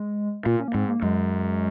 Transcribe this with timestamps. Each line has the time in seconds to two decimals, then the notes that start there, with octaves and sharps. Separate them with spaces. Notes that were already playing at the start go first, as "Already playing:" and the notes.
Already playing: G#3
0.46 A#2 F4
0.60 C#4
0.68 A#3
0.74 G#2 C4
0.88 A#3
1.02 F#2 G#3